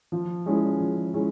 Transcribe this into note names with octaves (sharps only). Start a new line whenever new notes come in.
F3
G#3 C#4 E4 G#4
F3
G#3 C#4 E4 G#4